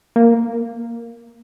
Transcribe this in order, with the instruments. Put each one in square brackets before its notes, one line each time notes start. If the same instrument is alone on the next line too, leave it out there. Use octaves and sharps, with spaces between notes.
[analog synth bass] A#3